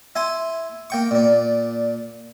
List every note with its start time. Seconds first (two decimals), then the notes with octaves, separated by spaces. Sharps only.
0.16 E4 G#5 C6
0.90 A#3 G5 C#6
1.11 A#2 D4